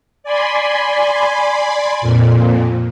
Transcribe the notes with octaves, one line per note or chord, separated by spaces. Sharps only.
D5 G#5 B5 C6
F2 A#2